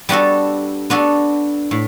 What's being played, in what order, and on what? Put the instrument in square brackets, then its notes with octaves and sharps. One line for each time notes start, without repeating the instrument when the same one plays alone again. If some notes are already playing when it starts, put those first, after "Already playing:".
[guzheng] G3 B3 D4 F#4 A4
B3 D4 F#4 A4
A2